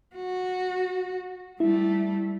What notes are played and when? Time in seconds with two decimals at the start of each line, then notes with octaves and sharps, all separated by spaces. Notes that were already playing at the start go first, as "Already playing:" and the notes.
0.15 F#4
1.60 G3 A3 E4